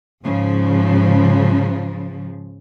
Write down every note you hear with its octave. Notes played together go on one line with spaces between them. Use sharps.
G#2 C#3 F3